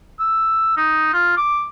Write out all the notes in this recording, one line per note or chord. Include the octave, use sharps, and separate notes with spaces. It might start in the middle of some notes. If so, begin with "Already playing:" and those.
E6
D#4
F4
D6